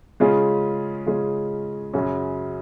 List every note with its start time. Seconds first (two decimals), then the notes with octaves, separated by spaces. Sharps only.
0.20 C#3 G#3 C#4 F4 G#4
1.06 C#3 G#3 C#4 F4 G#4
1.93 F#2 C#3 F#3 C#4 F#4